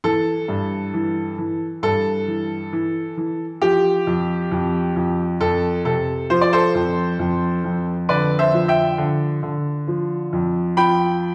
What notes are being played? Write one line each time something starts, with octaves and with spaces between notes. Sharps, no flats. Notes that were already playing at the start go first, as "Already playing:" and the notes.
E3 A4
G2
E3
E3
G2 A4
E3
E3
E3
F3 G4
F2
F2
F2
F2 A4
C3 A4
F3 C5
D5
A4 C5
F2
F2
F2
D3 B4 D5
C5 E5
F3
E5 G5
D3
D3
F3
F2
F3 G5 B5